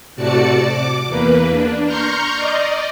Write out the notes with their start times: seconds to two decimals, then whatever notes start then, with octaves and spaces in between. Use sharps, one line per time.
0.16 A2 C3 F#4 D5 A5 C#7
0.63 D6
1.06 E2 A#3 B4
1.51 D4
1.86 A#5 C6 C#6 F6 G6
2.35 D5 D#5